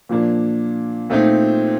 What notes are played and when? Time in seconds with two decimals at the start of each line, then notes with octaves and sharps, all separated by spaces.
0.09 A#2 F3 A#3 D4
1.10 A#2 A3 C4 D#4